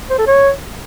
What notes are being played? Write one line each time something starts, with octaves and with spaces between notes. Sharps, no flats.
C5
A4
C#5